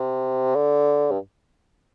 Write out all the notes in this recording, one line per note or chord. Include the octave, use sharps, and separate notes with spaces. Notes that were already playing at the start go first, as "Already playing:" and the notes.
Already playing: C3
D3
G2